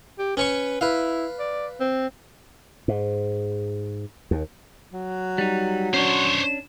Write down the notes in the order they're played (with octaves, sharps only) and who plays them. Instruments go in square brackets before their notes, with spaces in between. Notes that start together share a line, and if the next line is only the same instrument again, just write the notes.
[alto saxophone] G4
[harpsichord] C#4 C#5 C#6 [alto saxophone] B4
[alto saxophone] E4 [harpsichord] B4 F5
[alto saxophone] D5
C4
[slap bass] G#2
D#2
[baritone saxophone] F#3
[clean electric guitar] G3 D#4
[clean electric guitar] C#4 D4 [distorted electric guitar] C5 C#5